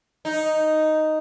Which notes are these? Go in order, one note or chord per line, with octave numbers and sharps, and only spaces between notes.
D#4